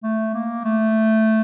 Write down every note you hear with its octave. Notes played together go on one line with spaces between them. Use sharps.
A3
A#3
A3